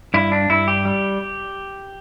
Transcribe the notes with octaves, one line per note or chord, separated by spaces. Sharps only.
G2 E4
D4
G2 E4
G4
G3